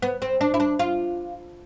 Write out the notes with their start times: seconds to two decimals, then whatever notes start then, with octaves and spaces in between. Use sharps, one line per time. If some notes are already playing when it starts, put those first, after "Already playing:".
0.02 B3
0.22 C4
0.41 D4
0.54 E4
0.60 D4
0.79 F4